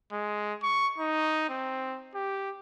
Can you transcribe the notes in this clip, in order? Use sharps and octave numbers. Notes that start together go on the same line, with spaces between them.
G#3
C#6
D#4
C4
G4